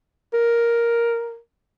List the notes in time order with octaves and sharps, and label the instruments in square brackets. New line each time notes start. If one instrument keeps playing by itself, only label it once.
[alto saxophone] A#4